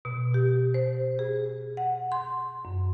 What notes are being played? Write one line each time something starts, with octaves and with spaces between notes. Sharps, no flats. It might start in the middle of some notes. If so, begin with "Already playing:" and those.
B2
G4
C5
G#4
F#5
C6
F#2